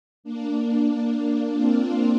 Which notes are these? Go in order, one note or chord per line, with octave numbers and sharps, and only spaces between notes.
A#3 D4
A#3 D4
C4 F4